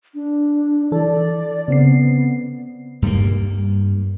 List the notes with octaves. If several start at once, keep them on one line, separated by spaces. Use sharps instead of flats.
D4
E3 A4 D5
C#3 B3 C4 C7
G2 G3 G#3 A#3